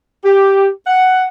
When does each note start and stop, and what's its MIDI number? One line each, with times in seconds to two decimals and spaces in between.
0.24 0.67 67
0.87 1.27 78